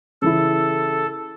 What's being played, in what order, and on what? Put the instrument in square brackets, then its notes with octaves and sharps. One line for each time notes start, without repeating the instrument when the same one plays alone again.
[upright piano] C#3 E3 E4 [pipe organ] A4